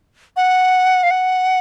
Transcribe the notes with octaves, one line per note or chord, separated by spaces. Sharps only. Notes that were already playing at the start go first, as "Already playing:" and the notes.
F#5
F5
F#5